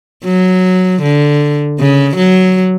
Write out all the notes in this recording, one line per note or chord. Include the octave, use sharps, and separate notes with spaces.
F#3
D3
C#3
F#3